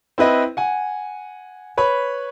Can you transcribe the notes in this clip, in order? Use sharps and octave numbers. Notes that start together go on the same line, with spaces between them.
C4 E4 B4 D#5
F#5 G#5
B4 C#5 B5